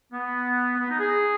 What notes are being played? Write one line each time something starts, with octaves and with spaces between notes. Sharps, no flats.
B3
B3
D#4
G#4